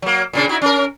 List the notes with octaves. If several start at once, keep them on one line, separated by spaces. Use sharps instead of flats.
F#3 A#3
A#2 C#3 D4
D#4 E4 F#4
C#4 A#4